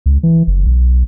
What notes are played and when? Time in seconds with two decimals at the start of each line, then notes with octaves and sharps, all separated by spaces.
0.06 C#2
0.23 E3
0.47 F#1
0.66 B1